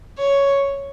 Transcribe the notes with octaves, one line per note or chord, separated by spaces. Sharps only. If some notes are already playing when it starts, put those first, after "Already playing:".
C#5